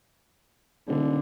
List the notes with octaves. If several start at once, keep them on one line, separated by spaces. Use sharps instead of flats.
D#1 D3